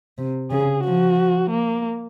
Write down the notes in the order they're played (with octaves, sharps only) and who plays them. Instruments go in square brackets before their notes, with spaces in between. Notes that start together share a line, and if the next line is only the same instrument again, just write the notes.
[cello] C3
[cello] C#3 [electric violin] G#4
[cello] F3 [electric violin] F#4
[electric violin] A#3